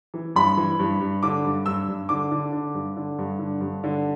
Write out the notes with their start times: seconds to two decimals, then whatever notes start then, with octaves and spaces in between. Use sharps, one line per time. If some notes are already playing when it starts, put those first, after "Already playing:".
0.14 E3
0.35 G2 B5
0.57 E3
0.79 G2
1.01 G2
1.23 D3 D6
1.45 G2
1.66 G2 E6
1.88 G2
2.09 D3 D6
2.31 D3
2.52 D3
2.74 G2
2.97 D3
3.19 G2
3.39 D3
3.61 G2
3.84 D3